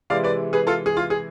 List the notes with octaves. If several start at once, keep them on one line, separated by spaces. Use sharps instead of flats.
C3 E3 G#3 D5 F5
B4 D5
G#4 B4
F4 A4
G#4
F4
G#4